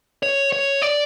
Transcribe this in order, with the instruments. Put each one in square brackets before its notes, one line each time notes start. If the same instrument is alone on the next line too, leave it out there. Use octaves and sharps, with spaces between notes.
[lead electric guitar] C#5
C#5
D5